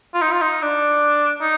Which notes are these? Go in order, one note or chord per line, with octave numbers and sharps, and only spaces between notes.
F4
D#4
F4
D#4
D4
D#4